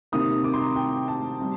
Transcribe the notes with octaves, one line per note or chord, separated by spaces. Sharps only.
C3 D#3 A#3 D#6
D6
C6
A#5
G5
A5
C3 G3